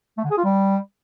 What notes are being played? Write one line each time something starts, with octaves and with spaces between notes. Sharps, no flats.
A3
D3
G#4
F4
G3